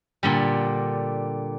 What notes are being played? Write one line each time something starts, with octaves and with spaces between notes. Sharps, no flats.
A#2 D3 G3